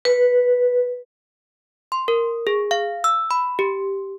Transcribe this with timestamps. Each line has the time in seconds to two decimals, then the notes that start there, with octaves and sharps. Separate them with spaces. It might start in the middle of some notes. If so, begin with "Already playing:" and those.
0.05 B4
1.92 C6
2.08 A#4
2.47 G#4
2.71 F5
3.04 E6
3.31 B5
3.59 G4